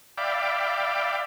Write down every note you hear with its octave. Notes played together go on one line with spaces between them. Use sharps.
D5 E5 F5 G5 B5 D6